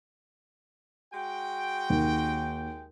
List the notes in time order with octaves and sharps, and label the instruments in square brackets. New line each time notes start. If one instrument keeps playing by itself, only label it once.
[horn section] G#3 F#4 G5
[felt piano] D#2